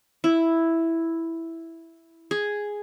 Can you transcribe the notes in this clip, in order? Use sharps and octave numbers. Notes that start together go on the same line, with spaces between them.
E4
G#4